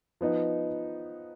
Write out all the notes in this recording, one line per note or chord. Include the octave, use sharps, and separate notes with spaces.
F3 B3 D#4